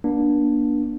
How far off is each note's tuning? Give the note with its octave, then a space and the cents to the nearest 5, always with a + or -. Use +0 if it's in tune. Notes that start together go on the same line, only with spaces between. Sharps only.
A#3 +45 D4 +0